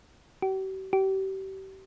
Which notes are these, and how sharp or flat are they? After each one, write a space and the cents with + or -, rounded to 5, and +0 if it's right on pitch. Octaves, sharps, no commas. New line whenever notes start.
G4 -45
G4 -35